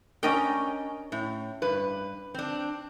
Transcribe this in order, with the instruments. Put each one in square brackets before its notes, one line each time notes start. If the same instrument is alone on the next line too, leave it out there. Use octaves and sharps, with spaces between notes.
[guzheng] C#4 D#5 G5 [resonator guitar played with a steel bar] D4 A#4 A#5
[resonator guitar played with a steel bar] A2
G2 B4
C4 D4